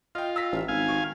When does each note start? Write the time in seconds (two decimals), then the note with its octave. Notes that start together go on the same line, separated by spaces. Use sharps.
0.15 F4 D#5 G5
0.36 E6 A#6 B6
0.52 A1
0.68 G#1 F5 G#5
0.88 D#3 C#6